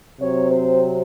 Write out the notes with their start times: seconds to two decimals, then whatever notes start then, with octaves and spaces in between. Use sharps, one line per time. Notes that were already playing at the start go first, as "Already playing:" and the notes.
0.20 C3 F#3 C4 C#5
0.52 C5